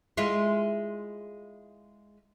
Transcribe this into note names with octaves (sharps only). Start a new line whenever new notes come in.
G#3 E4 F4